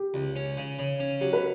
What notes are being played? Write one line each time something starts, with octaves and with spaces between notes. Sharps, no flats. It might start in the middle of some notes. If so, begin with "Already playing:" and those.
Already playing: G4
C#2
C#4
C#3
C#3
C#4
F#3 G4
B4